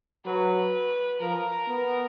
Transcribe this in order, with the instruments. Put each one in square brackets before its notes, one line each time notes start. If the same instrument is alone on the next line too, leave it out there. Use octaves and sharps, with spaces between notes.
[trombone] F#3 [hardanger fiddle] B4
[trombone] F3 [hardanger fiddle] A#4
[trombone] B3